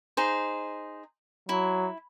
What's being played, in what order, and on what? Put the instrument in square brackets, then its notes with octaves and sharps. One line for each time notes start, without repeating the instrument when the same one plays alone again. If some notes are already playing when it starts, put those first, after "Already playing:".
[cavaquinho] D#4 G#4 C5
[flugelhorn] F#3 [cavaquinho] E4